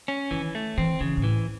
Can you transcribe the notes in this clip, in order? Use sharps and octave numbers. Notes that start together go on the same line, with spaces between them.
C#4
D#3 E3
A3
E3 C4
C#3 E3
A2
E3